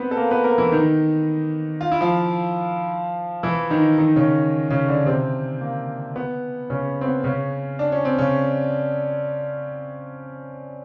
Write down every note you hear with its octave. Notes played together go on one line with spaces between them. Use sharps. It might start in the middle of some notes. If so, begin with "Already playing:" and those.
Already playing: B3 C4 B4 C5
A4
A#3 A#4
B3 B4
A#3 A#4
E3 E4
D#3 D#4
F4
E4
F3 F4
E3 E4
D#3 D#4
D#3 D#4
C#3 C#4
C#3 C#4
D3 D4
C3 C4
A#3
B3
C#3 C#4
C4
B3
C#3 C#4
D4
C#4
C4
C#3 C#4